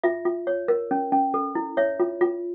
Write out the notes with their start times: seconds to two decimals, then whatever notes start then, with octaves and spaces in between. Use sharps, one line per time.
0.04 F4 E5
0.25 F4
0.47 C#5
0.68 A#4
0.91 C#4
1.12 C#4
1.34 A4
1.55 E4
1.77 C#5 E5
2.00 F4
2.21 F4